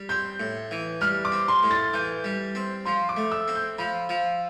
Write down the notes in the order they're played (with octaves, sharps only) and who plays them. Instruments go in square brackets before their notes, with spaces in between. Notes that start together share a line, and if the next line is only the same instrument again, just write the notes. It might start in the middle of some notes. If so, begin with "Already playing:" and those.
Already playing: [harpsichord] G3
[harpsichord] C4 [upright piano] G6
[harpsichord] A2
E3
[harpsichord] G3 [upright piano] F6
[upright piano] D6
[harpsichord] C4
[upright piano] C6
[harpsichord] A2
[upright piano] A6
[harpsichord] E3 [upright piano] G6
[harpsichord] G3
C4
[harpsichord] F3 [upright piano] C6
[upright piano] D6
[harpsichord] A3
[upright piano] E6
[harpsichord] C4
[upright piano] G6
[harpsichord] F3 [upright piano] B5
[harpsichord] F3